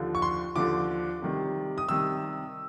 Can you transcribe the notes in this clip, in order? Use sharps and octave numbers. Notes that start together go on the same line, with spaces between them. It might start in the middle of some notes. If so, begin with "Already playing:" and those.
Already playing: D#2 D3 F3
C#6
C6
D#2 D3 F3 D6
C3 D#3 G3
D#6
C3 D#3 G3 E6